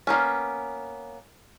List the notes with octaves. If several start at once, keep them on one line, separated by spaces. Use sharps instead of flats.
A#3 B3 C#4